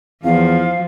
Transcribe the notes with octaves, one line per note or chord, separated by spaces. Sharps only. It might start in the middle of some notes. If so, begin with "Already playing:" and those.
E2 F3 F5